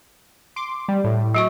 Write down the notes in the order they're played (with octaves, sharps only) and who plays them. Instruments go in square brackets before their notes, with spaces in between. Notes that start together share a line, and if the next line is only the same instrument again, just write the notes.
[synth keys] C6 D6
G3
A2
[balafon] F#3 F#4 C#6